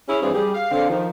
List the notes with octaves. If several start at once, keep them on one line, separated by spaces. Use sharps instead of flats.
C#4 E4 G#4
G2 E3 F3 G3 C4 G#4
G3 G4 G#4
F5
D3 C4 F5
D#3 F3